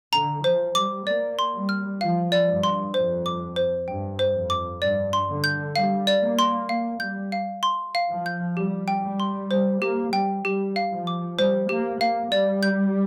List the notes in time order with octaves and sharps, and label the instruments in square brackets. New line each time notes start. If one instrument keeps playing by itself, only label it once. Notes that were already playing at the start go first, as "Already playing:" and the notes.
[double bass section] D3 [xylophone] A#5
[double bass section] F3 [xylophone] C5
[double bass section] G3 [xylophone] D6
[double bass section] A#3 [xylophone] D5
[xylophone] C6
[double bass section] G3
[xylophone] F6
[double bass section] F3 [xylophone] F5
[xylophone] D5
[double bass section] G2
[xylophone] C6
[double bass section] F2 [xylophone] C5
[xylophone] D6
C5
[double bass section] G2 [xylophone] G5
[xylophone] C5
[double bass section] F2
[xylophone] D6
[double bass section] G2 [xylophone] D5
[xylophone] C6
[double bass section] D3
[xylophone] G6
[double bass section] G3 [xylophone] F5
[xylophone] D5
[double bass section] A#3
[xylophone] C6
[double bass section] A#3 [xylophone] F5
[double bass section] G3 [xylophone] G6
[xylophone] F5
C6
F5
[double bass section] F3
[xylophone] G6
[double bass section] G3 [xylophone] G4
[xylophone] G5
[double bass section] G3
[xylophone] C6
[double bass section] G3 [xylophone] C5
[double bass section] A#3 [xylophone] G4
[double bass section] G3 [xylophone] G5
[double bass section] G3 [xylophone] G4
[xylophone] F5
[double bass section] F3
[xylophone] D6
[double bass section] G3 [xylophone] C5
[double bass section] A#3 [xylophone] G4
[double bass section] A#3 [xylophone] F5
[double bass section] G3 [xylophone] D5
[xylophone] G6